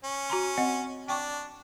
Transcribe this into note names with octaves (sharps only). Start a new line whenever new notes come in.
C#4
F#4 A#5 C6
C4 D#5 F#5
D4 G5 C#6 D6